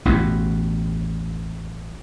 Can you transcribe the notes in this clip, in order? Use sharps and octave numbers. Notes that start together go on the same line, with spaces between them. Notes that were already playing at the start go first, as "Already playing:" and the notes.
A1 E2 B2